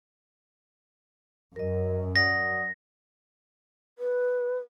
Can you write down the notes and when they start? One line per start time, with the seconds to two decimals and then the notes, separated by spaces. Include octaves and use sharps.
1.56 F#2 A#4 D#5
2.16 D5 F#5 D#6 A#6
3.98 B4